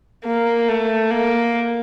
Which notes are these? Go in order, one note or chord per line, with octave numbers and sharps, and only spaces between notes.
A#3
A3
A#3